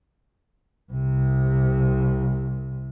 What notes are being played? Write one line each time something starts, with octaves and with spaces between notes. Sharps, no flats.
C2 C3